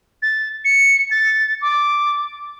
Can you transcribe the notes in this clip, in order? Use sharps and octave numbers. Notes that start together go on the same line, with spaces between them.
A6
C#7
A6
D6